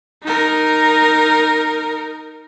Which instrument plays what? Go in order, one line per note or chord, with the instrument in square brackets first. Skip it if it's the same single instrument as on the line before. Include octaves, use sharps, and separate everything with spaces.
[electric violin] D#4 A#4